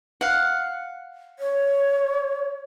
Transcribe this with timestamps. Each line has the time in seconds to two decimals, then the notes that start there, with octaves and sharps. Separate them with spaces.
0.21 F5 F#5
1.39 C#5